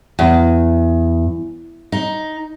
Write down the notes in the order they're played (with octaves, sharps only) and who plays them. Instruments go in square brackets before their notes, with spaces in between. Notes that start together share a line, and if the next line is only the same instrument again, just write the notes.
[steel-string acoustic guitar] E2
D#4